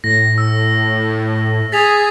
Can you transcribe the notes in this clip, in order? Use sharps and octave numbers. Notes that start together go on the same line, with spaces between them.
A2 A#6
E6
G#4 A6 B6 F7